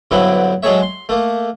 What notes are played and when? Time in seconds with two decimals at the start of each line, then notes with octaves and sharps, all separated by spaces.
0.11 G2 D3 F#3 B3 C4 E4
0.63 F#3 G#3 G#4 A4 C#5 E5
0.82 C6
1.09 A3 A#3